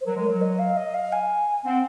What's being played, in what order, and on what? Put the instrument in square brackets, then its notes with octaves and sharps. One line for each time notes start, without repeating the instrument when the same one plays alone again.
[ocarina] C5
[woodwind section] F#3 [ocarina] A#4
[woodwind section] G#3
[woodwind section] F#3 [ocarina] A#4
[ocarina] D#5
F5
D#5
F5
G#5
[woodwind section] C4 [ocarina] F#5